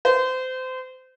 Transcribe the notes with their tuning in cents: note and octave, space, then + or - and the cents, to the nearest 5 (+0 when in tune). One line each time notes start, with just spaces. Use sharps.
C5 -30